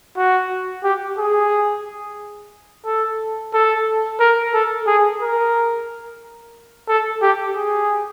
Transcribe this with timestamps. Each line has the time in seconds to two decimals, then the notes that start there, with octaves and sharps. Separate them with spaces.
0.17 F#4
0.84 G4
1.18 G#4
2.85 A4
3.54 A4
4.20 A#4
4.54 A4
4.87 G#4
5.21 A#4
6.89 A4
7.22 G4
7.56 G#4